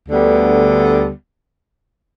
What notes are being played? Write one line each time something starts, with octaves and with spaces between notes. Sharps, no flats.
D2 D3 G3 B3